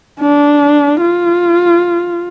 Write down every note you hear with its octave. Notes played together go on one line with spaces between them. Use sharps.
D4
F4